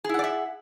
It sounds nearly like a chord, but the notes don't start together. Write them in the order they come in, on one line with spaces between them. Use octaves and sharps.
G#4 E4 F#5 D5 E5